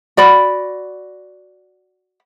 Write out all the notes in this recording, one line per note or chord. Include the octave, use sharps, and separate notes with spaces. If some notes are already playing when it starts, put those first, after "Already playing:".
F#4 D5 B5